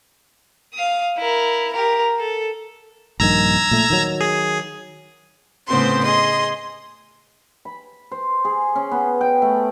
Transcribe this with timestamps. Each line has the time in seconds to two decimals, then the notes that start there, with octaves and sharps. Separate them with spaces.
0.74 F5 D#6
1.18 E4 A#4
1.73 G4 A#4
2.19 A4
3.20 A#1 G2 D#3 A#5 E6 G#6
3.71 A#2 A3
3.90 D#3 F#3
4.20 G#4
5.68 A2 C#3 B3 C4 C5 C6
6.03 G#4 D#5 C6
7.65 B5
8.12 C5
8.45 G#4
8.76 C#4
8.91 B3
9.21 G5
9.42 A3